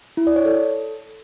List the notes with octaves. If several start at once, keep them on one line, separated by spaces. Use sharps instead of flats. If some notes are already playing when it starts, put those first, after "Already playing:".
E4
D5
C#5
A4